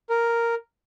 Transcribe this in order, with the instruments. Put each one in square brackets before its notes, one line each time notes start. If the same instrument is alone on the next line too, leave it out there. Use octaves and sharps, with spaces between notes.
[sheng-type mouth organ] A#4